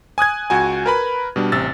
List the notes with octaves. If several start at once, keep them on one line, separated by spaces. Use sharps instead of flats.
G#5 D#6 F#6 G#6
C#2 F#4 G#5
A#4 B4 B5
B2 G3 D4
A1 C3 E6 A6